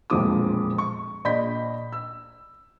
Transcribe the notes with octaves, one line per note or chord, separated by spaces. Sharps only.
E1 F2 A#2 F3 D6 D#6
C#6
A#1 D5 D#5 B5 G6 B6
E6